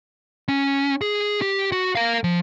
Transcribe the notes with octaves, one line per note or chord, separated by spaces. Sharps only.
C#4
G#4
G4
F#4
A#4 F5
F3